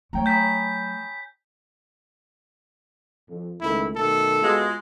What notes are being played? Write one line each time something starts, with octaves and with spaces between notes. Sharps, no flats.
F#3 A3 C#5 G5 A#5
G#5 B5 D#6 G6 B6
F2
C#2 D#3 A3 E4
B2 D#3 A3 A4
G#3 B3 F4 F#4